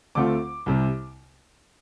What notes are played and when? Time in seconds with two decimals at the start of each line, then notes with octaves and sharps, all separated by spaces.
0.15 D2 D3 A3 C4 F4 D6
0.66 C2 C3 G3